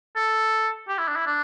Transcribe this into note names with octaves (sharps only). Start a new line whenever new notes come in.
A4
G4
E4
D4
E4
D4